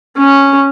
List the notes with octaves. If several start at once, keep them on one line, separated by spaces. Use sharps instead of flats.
C#4